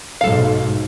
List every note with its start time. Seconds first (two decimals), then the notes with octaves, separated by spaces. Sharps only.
0.21 B1 G#2 A4 F5